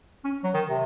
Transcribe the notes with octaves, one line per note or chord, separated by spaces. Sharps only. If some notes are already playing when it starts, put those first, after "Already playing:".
C#4
F#3
D#3
C3